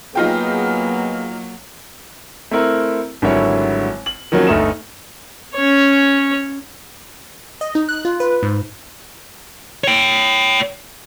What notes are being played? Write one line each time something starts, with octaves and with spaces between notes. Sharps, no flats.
F#3 A#3 B3 D#4 F4 G#4 G5
A3 C4 E4 A#4
G#1 D3 F#3 G3 E4 C#5
F#7
D#3 F3 F#3 A#3 C#4
G1 D2 A3 D#4 E7
C#4 C#5
D#5
D#4
F#6
F4
B4
G#2
C#5 G5